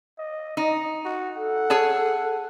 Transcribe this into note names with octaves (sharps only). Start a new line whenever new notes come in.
D#5
D#4 D#5
F#4
A4 F#5
G#4 C#5 A5